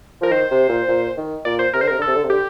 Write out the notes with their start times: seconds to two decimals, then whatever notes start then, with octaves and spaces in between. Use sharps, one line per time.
0.21 F3 A#4
0.32 D#3 C5
0.51 C3
0.69 A#2
0.88 A#2
1.17 D#3
1.45 A#2 D5
1.59 C5
1.74 C3 A#4
1.81 D3 C5
1.87 C3 A#4
1.98 D3 A4
2.07 C3
2.16 D3
2.24 C3
2.30 D3 G4